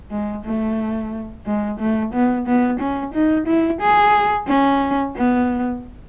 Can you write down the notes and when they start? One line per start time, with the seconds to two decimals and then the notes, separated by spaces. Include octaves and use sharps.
0.11 G#3
0.45 A3
1.46 G#3
1.79 A3
2.14 B3
2.47 B3
2.80 C#4
3.14 D#4
3.47 E4
3.81 G#4
4.48 C#4
5.15 B3